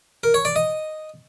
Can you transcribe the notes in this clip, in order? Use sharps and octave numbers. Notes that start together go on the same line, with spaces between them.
A#4
C#5
D5
D#5